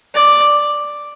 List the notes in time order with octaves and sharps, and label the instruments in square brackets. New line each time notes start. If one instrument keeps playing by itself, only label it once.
[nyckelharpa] D5